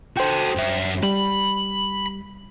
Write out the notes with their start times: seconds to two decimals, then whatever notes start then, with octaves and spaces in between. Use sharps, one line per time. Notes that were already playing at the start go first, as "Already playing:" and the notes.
0.17 F#4 A4 C5 G5
0.56 F#2 E5
1.03 G3 B5